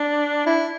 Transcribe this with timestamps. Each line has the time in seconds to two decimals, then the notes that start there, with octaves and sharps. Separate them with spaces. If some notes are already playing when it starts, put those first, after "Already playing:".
Already playing: D4
0.46 E4